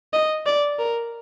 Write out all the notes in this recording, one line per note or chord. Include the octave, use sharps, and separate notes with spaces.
D#5
D5
A#4